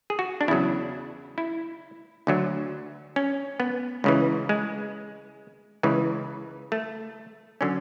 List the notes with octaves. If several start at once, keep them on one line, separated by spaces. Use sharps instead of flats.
G#4
F#4
D4
E2 C#3 F#3 E4
E4
D2 D3 F#3
C#4
B3
C#2 C#3 E3
G#3
C#2 C#3 E3
A3
D3 F#3 C#4